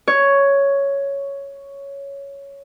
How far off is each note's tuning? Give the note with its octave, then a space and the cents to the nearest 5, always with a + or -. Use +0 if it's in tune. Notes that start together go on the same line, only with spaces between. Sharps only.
C#5 +5